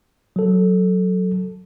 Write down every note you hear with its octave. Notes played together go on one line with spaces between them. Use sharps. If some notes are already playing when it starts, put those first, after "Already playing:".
F#3 A4